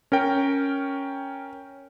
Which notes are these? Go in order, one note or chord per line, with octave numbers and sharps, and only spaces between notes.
C#4 A#4 G5